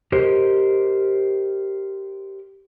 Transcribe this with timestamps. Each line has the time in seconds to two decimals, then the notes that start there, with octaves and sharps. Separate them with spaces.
0.12 G4 A#4 C5 D#5